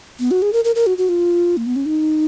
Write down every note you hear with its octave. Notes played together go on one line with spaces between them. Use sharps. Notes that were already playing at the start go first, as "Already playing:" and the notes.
B3
F#4
G#4
A#4
A#4
A#4
F#4
F#4
F4
A#3
B3
C#4
D#4